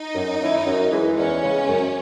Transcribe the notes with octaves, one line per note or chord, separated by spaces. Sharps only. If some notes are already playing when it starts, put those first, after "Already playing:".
Already playing: D#4
F#2
D#3 A#3 C#4 E4
F#2
E3 G#3
E2 C#4
C#3 G#3
F#2